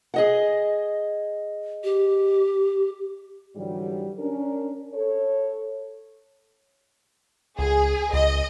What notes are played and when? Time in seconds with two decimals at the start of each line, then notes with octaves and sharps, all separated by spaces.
0.14 G#4 D#5 F#5
1.84 G4
3.56 G#2 D3 E3 F#3 G3
4.19 C#4 D4 A#4
4.94 A4 C#5
7.59 C#2 G#4
8.13 C#2 D#5